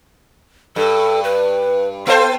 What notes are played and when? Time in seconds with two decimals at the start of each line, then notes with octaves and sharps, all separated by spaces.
0.76 G2 A4
1.24 B4
2.07 B3 A4 C5 F5